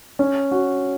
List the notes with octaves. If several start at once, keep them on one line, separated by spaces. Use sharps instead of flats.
C#4
F#4